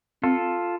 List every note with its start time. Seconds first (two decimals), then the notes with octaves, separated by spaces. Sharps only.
0.23 C4 F4 A4